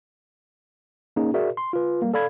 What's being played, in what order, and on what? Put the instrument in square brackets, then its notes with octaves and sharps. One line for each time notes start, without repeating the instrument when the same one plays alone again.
[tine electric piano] A#3 C#4 D#4 G#4
F#4 G#4 A#4 D5 E5
C6
F4 B4
G3 A#3
A4 D5 F5 B5 G#6